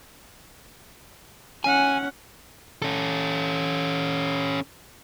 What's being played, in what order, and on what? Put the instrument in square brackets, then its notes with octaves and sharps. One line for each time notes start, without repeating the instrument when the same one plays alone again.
[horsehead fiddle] C#4 F#5 [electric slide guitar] G#5
[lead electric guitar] C#4 A4